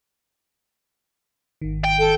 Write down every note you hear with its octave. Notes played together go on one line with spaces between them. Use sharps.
G#1 D#3
G5
A4